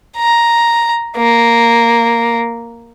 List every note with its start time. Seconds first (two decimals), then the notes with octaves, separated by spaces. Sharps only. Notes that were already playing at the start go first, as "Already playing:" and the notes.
0.18 A#5
1.17 A#3